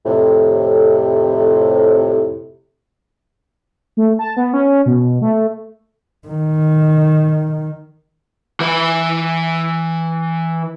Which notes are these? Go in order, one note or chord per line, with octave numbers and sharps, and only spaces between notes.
F2 A2 C3
A3
A5
B3
C#4
B2
A3
D#3
E3 B4